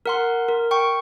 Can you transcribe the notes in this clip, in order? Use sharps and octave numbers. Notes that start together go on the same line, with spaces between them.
A#4 F#5 C6
A#4
G5 C#6